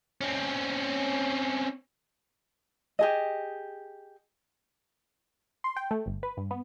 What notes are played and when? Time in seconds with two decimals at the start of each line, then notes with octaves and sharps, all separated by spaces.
0.21 C4 C#4
2.99 G4 G#4 D#5
5.64 C6
5.76 G5
5.91 A3
6.06 G1
6.23 B4
6.37 G2
6.51 B3